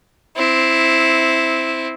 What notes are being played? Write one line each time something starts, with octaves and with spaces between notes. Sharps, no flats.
C4 E4